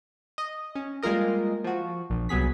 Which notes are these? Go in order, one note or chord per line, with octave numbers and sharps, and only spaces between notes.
D#5
C#4
G3 G#3 A#3 F4 A#4 D#5
F3 F#4
A#1
C2 F#3 B3 G#4 B6